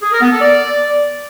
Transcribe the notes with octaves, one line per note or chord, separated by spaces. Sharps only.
G#4
A#4
B3
A4
D5